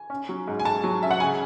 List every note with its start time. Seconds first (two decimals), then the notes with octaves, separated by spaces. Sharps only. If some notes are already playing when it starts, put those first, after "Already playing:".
Already playing: G#5
0.10 C#4
0.29 F#3
0.48 G#2
0.59 G#5
0.65 G#2 A5
0.84 F#3
1.02 C#4 E5
1.11 F#5
1.20 C#3 G#5